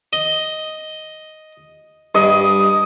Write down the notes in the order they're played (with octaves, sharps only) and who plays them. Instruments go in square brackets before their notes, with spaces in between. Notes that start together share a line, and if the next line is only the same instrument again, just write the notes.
[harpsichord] D#5
[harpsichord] G2 [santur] D#5